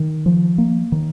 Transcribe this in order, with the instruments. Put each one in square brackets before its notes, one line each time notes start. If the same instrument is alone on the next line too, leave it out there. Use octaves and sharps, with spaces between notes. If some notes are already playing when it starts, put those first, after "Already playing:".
Already playing: [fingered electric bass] D#3
F3
A#3
D#3